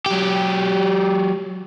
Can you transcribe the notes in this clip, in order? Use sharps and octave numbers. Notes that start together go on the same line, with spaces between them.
F#3 G4